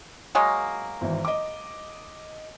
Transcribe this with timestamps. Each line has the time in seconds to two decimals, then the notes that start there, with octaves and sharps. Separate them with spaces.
0.35 F#3 G#3 A#3
1.01 G#1 E3
1.25 D#5 D6